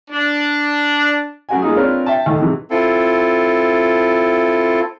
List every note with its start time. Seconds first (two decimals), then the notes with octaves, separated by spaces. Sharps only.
0.11 D4
1.49 F#2 F#4 G#5
1.61 G#3 A#3 D#4 F4 G#4
1.76 C4 D4 F4 A#4 B4 C#5
2.06 E5 G5 A5
2.26 D#2 A2
2.39 G#2 C3 E3
2.70 C4 E4 F4 A4